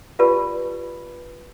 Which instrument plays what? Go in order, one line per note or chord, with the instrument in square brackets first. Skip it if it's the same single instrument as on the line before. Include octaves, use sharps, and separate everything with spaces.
[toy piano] F4 G4 B4 D5 A5 B5